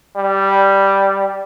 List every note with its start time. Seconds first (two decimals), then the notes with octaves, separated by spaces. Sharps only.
0.16 G3